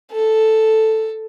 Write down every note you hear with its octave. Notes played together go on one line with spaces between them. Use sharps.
A4